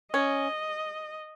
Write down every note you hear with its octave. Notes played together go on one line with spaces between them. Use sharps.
C#4 D#5